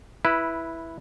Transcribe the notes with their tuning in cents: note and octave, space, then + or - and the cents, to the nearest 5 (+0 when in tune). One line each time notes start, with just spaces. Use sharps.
E4 +0 B4 -15